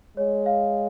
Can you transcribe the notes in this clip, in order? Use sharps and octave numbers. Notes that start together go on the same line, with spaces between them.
G#3 C#5
F5